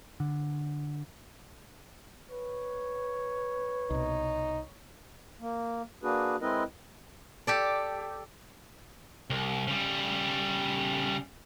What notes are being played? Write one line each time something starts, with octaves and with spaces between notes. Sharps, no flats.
D3
B4 C#5
C2 B2 D#4
A#3
A#3 D4 F#4 G#4 B4
G#3 C4 E4 A#4 B4 D#5
G4 A4 D5
C2
C#3 G3